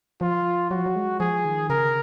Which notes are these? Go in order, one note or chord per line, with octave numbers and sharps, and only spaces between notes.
F3 F4
F#3 F#4
F3
F#3
G#3
F3 G#4
D#3
C#3 A#4